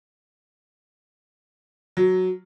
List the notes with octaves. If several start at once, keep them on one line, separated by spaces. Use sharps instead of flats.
F#3